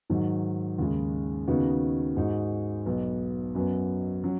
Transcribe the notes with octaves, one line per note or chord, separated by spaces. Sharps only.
G#2 D#3 F#3
D#2 C#3 G#3
D#2 C#3 B3 D#4 F#4
G#2 G#3 D#4 F#4
B1 B2 B3
F#2 F#3 B3
F#3 C#4